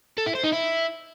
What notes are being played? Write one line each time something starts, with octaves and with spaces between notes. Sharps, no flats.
A4
E4
C5
D#4
E4